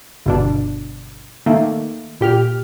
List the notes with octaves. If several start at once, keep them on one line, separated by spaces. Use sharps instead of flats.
G1 B2 D4
D#3 A3 A#3
A#2 G4 F6